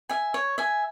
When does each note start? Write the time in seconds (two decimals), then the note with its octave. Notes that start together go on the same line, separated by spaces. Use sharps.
0.09 E5 G#5
0.34 C#5
0.58 E5 G#5